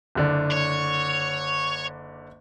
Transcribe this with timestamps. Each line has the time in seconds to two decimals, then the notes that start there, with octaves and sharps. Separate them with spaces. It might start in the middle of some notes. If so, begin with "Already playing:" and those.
0.15 F#1 D3 D5
0.52 C#5